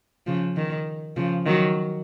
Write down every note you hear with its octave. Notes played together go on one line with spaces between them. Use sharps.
C#3 F3
D#3
C#3 F3
D#3 F#3